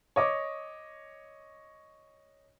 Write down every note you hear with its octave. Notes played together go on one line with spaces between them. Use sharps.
C#5 D#5 D6